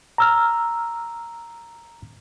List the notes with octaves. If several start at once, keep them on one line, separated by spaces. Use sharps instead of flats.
A#5 E6 F6